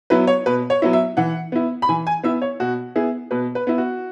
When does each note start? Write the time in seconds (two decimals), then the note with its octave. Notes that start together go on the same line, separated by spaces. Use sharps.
0.10 F#3 B3 E4 B4
0.27 C#5
0.46 B2 B4
0.70 C#5
0.82 F#3 B3 E4
0.93 E5
1.17 E3 F#5
1.52 B3 E4
1.82 B5
1.89 E3 G#5
2.07 G#5
2.23 B3 E4 E5
2.42 C#5
2.60 B2 F#4
2.96 B3 E4 G#4
3.31 B2 B4
3.55 B4
3.67 B3 E4
3.78 F#4